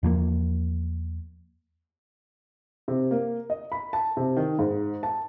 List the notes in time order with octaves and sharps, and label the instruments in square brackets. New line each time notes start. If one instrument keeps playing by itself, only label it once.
[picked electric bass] E2 F3 F#3 A#3
[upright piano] C3
A#3
D#5
B5
A5
C3
D#3
G#2
A5